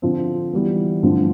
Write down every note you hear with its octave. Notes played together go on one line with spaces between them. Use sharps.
D3 F3 C4
E3 G3 B3
G2 D3 F3 A3 C4